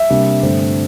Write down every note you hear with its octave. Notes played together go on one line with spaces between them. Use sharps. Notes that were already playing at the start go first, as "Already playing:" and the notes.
Already playing: E5
C3 G3 A#3 D4
G2 D3 A3 C4